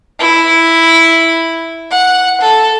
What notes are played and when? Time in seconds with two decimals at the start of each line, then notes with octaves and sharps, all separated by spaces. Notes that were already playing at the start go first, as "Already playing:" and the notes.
0.19 E4
1.90 F#5
2.41 A4